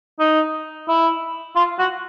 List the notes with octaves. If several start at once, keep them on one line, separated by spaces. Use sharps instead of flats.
D#4
E4
F4
F#4